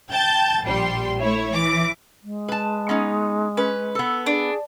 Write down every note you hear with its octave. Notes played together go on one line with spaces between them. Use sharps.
G5 A5 G6 A6
A#1 G3 G5 C6
A3 E4 C#5
E3 D6
G#3
B4 A5
B3 C#4 D#4
C#4 B4
B3 A4
D4 G#4